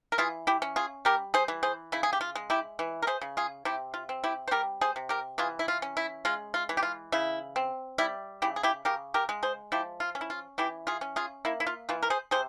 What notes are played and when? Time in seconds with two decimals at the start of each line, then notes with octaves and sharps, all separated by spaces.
0.12 A#4
0.18 E3 F4 G#4
0.47 E4 G4
0.62 C#4
0.76 F4 G#4
1.05 G3 G4 A#4
1.34 G#4 C5
1.48 E3
1.63 G#4 C5
1.92 C#3 E4
2.03 G#4
2.13 G4
2.21 F4
2.35 G#3
2.50 E4 G4
2.79 E3
3.02 A#4
3.07 G#4 C5
3.21 C#3
3.37 F4 G#4
3.65 C3 E4 G4
3.94 F4
4.09 C4
4.24 E4 G4
4.48 C5
4.51 G3 G4 A#4
4.81 G#4 C5
4.96 C3
5.09 G4 A#4
5.38 E3 F4 G#4
5.59 E4
5.68 F4
5.82 C#4
5.97 E4
6.25 G#3 F4
6.54 F4
6.69 E3
6.77 G4
6.83 F4
7.12 C#3 E4
7.56 C4
7.98 G3 E4
8.42 C#3 E4 G4
8.56 G#4
8.63 E4 G4
8.85 C#3 G4 A#4
9.14 G4 A#4
9.29 G#3
9.43 G#4 C5
9.72 F3 E4 G4
10.00 F4
10.15 C#4
10.21 E4
10.30 F4
10.58 E3 E4 G4
10.87 F4 G#4
11.01 C#4
11.16 F4 G#4
11.45 A#3 E4
11.60 E4
11.67 F4
11.89 E3 F4
12.02 A#4
12.10 G#4 C5
12.31 C3 G#4 C5